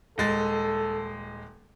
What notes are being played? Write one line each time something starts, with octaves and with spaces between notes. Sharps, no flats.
D#1 G#3 A4 A6